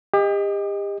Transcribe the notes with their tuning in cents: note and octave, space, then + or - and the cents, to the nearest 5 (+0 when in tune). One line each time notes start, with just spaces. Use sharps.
G4 +35 D#5 +0